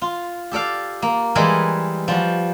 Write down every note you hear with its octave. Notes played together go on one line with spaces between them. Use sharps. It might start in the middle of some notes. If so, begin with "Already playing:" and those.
F4
G4 A4 D5 F5
A#3
E3 G3 G#3 A#4 D#5 B5
F3 G3 F#4